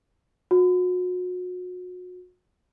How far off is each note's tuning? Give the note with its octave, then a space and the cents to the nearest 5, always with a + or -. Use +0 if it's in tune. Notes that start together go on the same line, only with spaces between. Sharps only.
F#4 -35